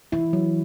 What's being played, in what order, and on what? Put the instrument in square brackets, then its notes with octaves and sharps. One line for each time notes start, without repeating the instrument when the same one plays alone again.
[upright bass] E3 [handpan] E4
[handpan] F#3